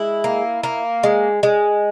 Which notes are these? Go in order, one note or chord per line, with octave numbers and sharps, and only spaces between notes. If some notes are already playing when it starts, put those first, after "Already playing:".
Already playing: G#3 E4
A#3
A#3
G#3
G#3